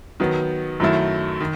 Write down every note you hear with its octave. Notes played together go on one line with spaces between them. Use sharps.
D#3 F#3 B3
F#2 D#3 F#3 A3 E4
D#3